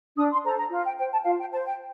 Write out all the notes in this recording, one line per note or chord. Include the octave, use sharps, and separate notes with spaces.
D4 D#6
C6
A4 C5 A#5
A#5
F4
G5
C5 G5
A5
F4 F5
G5
C5 A5
G5